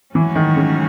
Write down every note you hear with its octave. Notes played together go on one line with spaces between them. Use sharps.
G#2 E3 F#3 A3 C#4 F#4
D#3
C#3